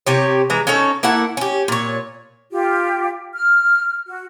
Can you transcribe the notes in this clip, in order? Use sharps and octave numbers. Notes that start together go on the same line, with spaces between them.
C3 G4 C#5
E3 G#3 A#5
C#4 D#4 A4 C#5
A#3 E4 A4 F#5
C#4 G4
A#2 C#5
F4 G4
F6
F#4